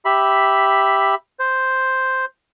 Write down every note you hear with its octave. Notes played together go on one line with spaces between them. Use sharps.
G4 E5 B5
C5